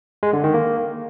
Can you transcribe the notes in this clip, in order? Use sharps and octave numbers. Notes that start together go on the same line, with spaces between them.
G#3
D3
D#3
A#3